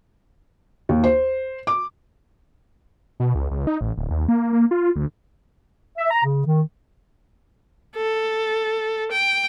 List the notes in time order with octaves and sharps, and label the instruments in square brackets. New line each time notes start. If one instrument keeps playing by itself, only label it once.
[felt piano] D#2
C5
D6
[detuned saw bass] B2
C#2
C#2
D#4
A1
D1
D#2
A#3
A#3
F4
D2
[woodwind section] E5
A#5
C#3
D#3
[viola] A4
G5